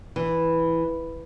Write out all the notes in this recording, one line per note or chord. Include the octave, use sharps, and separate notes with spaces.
E3